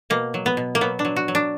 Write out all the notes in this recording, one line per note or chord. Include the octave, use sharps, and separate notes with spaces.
B2 A#3
F#3
B3
B2
A#3
F#3 B3
D4
F#3
F#4
F#3
D4